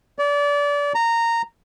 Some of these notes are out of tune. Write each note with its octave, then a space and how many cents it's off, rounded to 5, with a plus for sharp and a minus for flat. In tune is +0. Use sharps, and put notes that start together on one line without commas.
D5 -30
A#5 -15